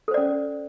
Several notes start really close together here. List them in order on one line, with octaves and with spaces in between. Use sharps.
A4 C5 D5 C#4